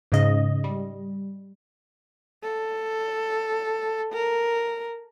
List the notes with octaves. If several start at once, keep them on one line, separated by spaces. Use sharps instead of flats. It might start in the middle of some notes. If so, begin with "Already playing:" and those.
G#2 C#3 D#5
G3
A4
A#4